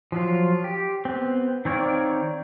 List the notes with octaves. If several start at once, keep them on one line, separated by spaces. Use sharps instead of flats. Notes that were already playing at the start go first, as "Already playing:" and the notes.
F3 F#3 F4
G4
B3 C4
D#3 C4 C#5 D5 F5